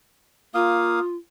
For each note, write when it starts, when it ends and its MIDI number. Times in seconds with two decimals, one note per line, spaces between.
0.54 0.99 58
0.54 1.16 65
0.54 0.99 77
0.54 0.99 87